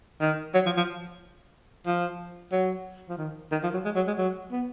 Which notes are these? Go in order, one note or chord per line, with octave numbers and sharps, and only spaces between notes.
D#3
F#3
F3
F3
F3
F#3
F3
D#3
D#3
F3
F#3
G#3
F#3
G#3
F#3
B3